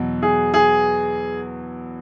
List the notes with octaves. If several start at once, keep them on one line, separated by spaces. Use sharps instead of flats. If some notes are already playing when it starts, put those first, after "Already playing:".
Already playing: E2 B2 F#3
G#4
G#4